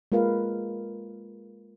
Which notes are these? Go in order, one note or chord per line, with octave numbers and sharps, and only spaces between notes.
G#3 A#3 F4 A#4 B4 F5